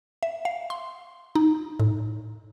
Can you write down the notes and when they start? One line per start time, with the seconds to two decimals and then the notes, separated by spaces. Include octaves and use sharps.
0.23 E5
0.45 F5
0.70 C6
1.35 D#4
1.80 A2